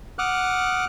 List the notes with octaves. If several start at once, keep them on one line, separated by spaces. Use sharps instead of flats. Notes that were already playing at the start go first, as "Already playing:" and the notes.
F#5 D6 D#6 F6 F#6